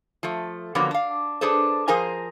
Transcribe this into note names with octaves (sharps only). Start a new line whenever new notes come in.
F3 A3
D3 F3 F#3 A#3 B3
D4 F5
D4 G#4 A4 B4 C5
F3 G#4 A#4 C5 G#5 A#5